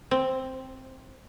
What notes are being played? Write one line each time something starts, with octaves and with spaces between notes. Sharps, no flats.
C4